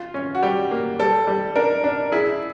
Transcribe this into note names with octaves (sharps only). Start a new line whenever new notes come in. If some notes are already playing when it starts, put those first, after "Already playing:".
Already playing: F4
C#4
F#4
G3 G4
A#3
G3 A4
G3
D4 A#4
D4
E4 G#4